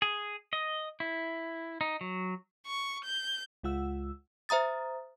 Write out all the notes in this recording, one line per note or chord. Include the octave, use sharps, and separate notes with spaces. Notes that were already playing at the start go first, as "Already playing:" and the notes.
G#4
D#5
E4
D#4
F#3
C#6
G6
C#2 G#3 F4 F#5 E6
C5 E5 A#5 D#6 A6